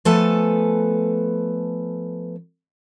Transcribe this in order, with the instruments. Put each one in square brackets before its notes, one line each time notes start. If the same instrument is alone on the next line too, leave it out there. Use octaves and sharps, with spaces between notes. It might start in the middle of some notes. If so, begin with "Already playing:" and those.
[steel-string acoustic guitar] F3 A3 B3 A4 B4 G#5